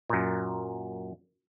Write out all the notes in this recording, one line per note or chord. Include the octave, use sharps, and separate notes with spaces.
F#2 A#2